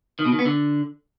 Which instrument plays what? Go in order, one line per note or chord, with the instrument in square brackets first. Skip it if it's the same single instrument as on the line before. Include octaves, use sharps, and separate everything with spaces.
[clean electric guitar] D#3
B2
D#3
B3
D3